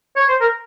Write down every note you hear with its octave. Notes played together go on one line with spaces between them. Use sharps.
C#5
C5
A#4